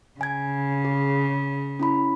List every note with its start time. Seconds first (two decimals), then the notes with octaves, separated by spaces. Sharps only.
0.21 C#3 G#5 G#6
0.85 G#4
1.80 C#4 E4 B5